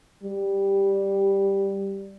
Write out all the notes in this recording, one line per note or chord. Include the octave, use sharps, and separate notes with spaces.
G3